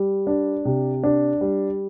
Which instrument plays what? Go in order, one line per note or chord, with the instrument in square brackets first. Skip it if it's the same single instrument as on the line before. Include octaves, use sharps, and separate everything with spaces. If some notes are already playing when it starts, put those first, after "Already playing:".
Already playing: [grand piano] G3
D4
C3
D4
G3